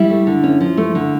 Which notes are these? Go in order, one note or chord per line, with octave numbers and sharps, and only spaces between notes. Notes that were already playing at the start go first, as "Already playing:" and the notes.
Already playing: G3 E4
A3
D3
C#4
F3
A3
D3